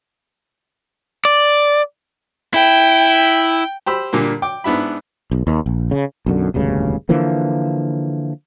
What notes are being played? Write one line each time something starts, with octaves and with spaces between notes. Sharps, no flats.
D5
E4 G5
G4 C5 B5 E6
A#2 D3 G3 A#3
G5 D6
G#2 B3 D4 E4 B5
B1
D#2
A#1
C#3
B1 F#2 D3
E1 D2 G2 C#3
D3 E3 F3 A#3